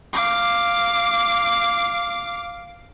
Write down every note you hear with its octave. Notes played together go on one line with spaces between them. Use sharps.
F5 D6